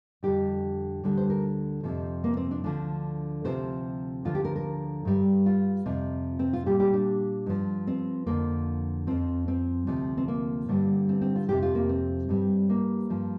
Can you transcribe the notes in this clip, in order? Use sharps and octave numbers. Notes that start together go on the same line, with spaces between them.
F2 D3 G3 G4
D2 D3 G3
C5
A#4
F2 C3 F3
A#3
C4
D4
D2 D3 F3 D4
D2 C3 F3 C5
D2 D3 F3 F4
G4
A#4
A#4
G2 G3
F4
F2 C3 F3
C4
F4
A#2 G3 G4
G4
D4
G2 F3
C4
F2 D3 F3 A#3
F2 F3 C4
C4
D2 C3 F3
C4
A#3
G2 D3 G3
C4
C4
F4
F2 C3 F3 G4
F4
A#3
C4
G2 G3
A#3
G2 F3